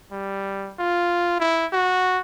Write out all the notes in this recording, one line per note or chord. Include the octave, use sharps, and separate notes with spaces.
G3
F4
E4
F#4